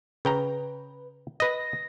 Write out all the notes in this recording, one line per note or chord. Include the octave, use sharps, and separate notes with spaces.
C#3 B4 G5 A#5
B4 D#5 A#6